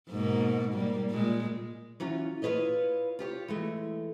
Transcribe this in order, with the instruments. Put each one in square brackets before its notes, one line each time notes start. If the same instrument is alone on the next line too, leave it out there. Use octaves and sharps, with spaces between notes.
[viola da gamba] G#2 B2 A#3
G3 A#3
A#2 G#3
[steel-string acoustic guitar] E3 F#3 C#4 F4
E4 F4 G#4 B4 C#5 D#5
F4 G4 C#5
E3 G#3 A3